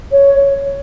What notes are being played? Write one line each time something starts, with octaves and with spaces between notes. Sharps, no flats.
C#5